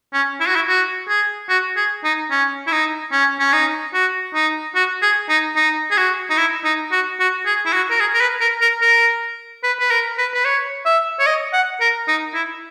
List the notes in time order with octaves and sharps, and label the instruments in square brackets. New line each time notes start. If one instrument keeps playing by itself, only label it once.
[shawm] C#4
E4
F#4
E4
F#4
G#4
F#4
G#4
D#4
C#4
E4
D#4
C#4
C#4
D#4
F#4
D#4
F#4
G#4
D#4
D#4
G#4
F#4
D#4
E4
D#4
F#4
F#4
G#4
E4
F#4
A#4
G#4
A#4
B4
A#4
A#4
A#4
B4
B4
A#4
B4
B4
C#5
E5
C#5
D#5
F#5
A#4
D#4
E4